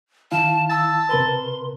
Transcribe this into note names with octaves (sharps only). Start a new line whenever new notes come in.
D#3 E4 F5 A5
A5 E6
C3 A#4 B4 C6